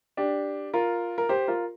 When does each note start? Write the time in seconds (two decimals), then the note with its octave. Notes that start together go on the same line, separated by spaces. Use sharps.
0.17 D4 G4
0.74 F4 A#4
1.18 A#4
1.29 G4 C5
1.48 F4 A#4